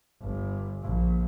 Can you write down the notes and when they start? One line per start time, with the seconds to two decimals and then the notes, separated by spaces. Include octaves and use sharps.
0.21 G1
0.83 A#1